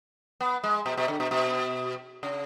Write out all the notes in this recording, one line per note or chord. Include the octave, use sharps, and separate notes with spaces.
B3
G#3
B2
B2
D3
B2
B2
C#3